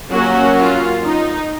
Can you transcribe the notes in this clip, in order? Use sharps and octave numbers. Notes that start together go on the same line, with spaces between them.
F#3 A#3 C#4 F#4
F4
D#4